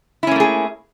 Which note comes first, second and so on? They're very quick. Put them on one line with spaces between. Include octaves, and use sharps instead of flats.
E4 C#4 A#3 A3 G#4